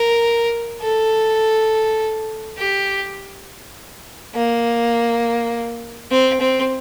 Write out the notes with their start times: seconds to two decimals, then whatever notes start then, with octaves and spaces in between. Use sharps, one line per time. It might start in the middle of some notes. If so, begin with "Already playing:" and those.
Already playing: A#4
0.82 A4
2.58 G4
4.35 A#3
6.11 C4
6.41 C4